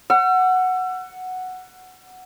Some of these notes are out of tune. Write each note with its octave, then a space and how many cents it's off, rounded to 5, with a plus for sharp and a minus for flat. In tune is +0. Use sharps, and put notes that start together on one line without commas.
F#5 +0 E6 +35